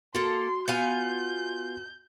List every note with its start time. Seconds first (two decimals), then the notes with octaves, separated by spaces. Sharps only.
0.15 A#3 F#4 A4 C6
0.68 B3 F4 G#5 G6